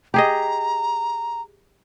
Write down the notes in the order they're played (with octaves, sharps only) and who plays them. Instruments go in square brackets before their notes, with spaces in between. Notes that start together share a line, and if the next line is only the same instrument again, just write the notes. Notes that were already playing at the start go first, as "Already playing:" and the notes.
[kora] G4 G#4 D#5 [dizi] A#5